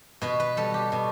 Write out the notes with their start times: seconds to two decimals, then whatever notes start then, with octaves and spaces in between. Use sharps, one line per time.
0.21 B2 B4
0.40 B4
0.57 G3 A4
0.74 G4
0.92 B2